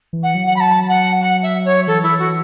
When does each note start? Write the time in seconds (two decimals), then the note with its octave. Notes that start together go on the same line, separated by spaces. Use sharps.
0.13 E3
0.23 F#5
0.35 F#3
0.47 F#5
0.56 B5
0.60 A5
0.89 F#5
1.21 F#5
1.43 E5
1.65 C#5
1.87 E3 A4
2.03 E4
2.19 F#4